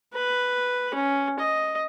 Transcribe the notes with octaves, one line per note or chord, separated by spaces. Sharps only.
B4
C#4
D#5